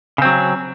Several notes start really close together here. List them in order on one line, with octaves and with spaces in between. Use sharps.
C#3 C4 F#3